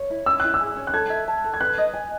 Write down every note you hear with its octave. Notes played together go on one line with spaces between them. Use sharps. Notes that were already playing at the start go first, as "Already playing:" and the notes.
Already playing: C#5
E4
C#4 E6
E4 F#6
E6
G#4
C#4
F#6
A4 G#6
E5
A5
A4
G#6
B4 F#6
D#5
G#5